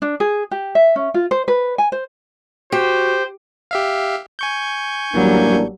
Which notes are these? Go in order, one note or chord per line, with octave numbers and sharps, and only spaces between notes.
D4
G#4
G4
E5
C#4
F4
C5
B4
G#5
C5
F#4 G4 C5
G4 E5 F5
G#5 C#6 G6
A1 F#3 G3 A#3 D4